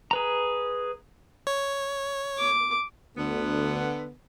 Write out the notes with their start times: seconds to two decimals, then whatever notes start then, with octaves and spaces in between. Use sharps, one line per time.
0.11 G#4 B4 A#5
1.47 C#5
2.38 D6
3.17 D2 D3 B3